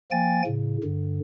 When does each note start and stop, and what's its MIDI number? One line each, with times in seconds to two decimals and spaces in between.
0.11 0.42 53
0.11 0.42 58
0.11 0.42 79
0.11 0.42 80
0.11 0.42 93
0.46 0.78 45
0.46 0.78 49
0.84 1.20 43
0.84 1.20 50